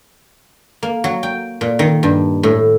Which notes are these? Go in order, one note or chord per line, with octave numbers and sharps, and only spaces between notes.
A#3
F#3
G5
A#2
D#3
G2
A2